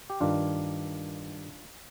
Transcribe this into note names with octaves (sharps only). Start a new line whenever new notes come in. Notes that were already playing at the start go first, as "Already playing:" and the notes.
G4
G2 D#3 D4 F4